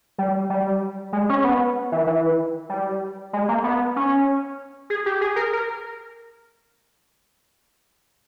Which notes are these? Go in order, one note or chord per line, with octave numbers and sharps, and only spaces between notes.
G3
G3
G#3
C#4
B3
E3
E3
G3
G#3
A#3
B3
C#4
G#4
G4
G#4
A#4
A#4